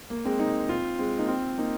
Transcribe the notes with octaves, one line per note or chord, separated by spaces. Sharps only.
A#3
G#3 C4
A#3 D#4
C4 F4
G#3 C4
A#3 D#4
C4 F4
A#3 D#4